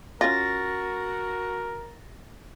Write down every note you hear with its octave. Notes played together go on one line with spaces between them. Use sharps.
C#4 F4 F#4 A#4 A6 A#6